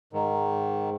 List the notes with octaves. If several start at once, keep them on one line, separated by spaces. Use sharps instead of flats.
G#2 D#3